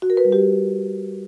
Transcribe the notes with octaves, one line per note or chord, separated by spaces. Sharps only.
F#4
A#4
B4
G3
G4